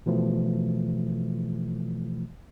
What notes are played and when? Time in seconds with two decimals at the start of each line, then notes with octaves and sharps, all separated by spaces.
0.06 B2 E3 F3 A3